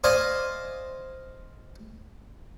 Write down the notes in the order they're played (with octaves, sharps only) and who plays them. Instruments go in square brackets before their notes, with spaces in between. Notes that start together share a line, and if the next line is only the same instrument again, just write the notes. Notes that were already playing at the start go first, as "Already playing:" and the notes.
[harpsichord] C5 D5 D#5 F5 G#5 C6